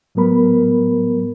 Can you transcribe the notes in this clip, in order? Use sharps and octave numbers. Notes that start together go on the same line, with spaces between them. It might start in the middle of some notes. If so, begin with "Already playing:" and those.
A2 F#3 G3 B3 A#4 B5